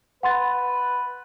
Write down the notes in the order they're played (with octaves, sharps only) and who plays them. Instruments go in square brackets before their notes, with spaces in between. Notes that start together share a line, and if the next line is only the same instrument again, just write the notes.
[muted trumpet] B4 [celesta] F#5 C6 A6